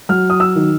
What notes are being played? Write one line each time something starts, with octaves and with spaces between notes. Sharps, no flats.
F#3 F6
D#6
E6
D#3